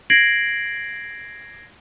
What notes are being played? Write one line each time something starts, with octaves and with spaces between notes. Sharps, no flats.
G#6 A#6 C7 D7 F#7